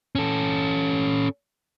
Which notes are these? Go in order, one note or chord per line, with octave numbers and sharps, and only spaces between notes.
C#4 A4